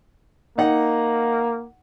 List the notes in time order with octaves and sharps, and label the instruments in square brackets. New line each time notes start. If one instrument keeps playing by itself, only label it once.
[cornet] A#3 [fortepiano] D#4 F#5